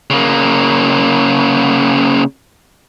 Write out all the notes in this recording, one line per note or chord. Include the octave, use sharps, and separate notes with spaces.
C#3 A#3